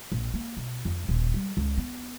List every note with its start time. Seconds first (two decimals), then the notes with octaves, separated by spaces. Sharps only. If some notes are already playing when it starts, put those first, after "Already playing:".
0.12 A#1
0.34 A#3
0.57 B2
0.85 F2
1.09 D#1
1.34 G3
1.57 C#2
1.78 B3